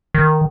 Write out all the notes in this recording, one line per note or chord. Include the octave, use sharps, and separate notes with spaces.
D#3